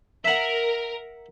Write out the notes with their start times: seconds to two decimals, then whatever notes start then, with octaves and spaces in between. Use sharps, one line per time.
0.25 A#4 E5 F#5